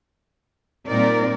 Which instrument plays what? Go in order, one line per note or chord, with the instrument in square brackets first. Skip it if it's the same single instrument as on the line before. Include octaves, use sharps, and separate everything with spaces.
[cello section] A#2 G3 C4 D#4 A#4 D5